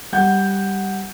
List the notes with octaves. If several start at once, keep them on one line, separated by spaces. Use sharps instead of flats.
G3 F#5 G6